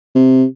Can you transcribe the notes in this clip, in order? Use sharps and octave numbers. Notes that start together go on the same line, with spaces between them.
C3